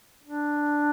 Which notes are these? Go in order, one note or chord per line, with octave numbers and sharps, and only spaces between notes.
D4